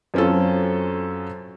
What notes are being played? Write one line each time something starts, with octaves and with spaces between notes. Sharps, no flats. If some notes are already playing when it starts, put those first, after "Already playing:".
F#2 C4 C#4 F4 A4